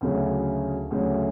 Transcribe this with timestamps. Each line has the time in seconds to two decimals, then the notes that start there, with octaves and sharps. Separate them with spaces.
0.01 D2 C#3 F#3 A3 C#4
0.91 D2 C#3 F#3 A3 C#4